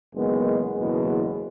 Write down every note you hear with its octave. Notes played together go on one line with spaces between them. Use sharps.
F#1 E2 D#3 G#3 B3
F#1 E2 B2 G#3 B3